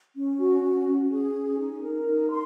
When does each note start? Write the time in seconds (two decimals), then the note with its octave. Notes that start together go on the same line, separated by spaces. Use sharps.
0.16 C#4
0.39 F#4
0.63 C#4
0.87 C#4
1.11 G#4
1.34 C#4
1.58 D#4
1.82 A#4
2.06 D#4
2.29 C6